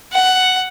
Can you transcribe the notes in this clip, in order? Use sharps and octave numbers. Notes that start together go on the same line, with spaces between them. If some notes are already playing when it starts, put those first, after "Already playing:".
F#5